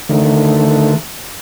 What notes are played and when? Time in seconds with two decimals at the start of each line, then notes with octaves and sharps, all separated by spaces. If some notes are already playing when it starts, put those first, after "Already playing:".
0.09 D3 D#3 A3